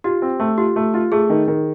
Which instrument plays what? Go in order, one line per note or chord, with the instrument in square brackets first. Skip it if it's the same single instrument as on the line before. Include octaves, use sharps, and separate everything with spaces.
[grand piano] F4 [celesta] G4
[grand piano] C4
A3
[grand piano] F4 [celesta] G4
[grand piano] A3
F4
[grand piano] A3 [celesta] G#4
[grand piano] D#3
D#3